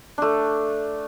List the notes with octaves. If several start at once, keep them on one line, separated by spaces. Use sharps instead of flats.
A3 D4